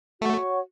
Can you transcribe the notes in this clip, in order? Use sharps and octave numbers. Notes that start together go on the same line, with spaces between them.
A3 F#4 C#5 F#5 C#6